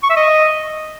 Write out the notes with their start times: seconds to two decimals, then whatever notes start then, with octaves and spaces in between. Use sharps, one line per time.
0.03 C#6
0.10 E5
0.17 D#5